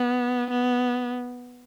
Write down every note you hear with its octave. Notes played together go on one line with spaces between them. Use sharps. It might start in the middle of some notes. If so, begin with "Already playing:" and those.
Already playing: B3
B3